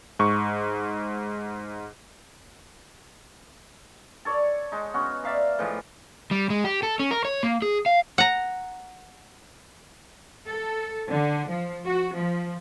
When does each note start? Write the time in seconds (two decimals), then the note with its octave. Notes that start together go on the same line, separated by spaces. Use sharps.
0.19 G#2 C#6
4.25 A4 C#5 D5
4.72 G#3 D#4
4.94 B3 C#4 F#4
5.24 D5 E5 F5 A#5
5.59 A2 E3 F3 G#3
6.31 G3
6.50 G#3
6.64 G4
6.83 A4
7.00 C#4
7.11 A#4
7.25 C#5
7.43 A#3
7.62 G#4
7.86 F5
8.18 F#5 A#5
10.48 A4
11.08 D3
11.47 F3
11.84 F#4
12.15 F3